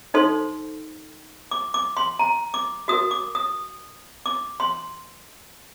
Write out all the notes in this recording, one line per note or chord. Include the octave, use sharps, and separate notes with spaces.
D#4 A4 C5 C6
D6
D6
C6
A#5
D6
F#4 A#4 D#6
D6
D#6
D6
C6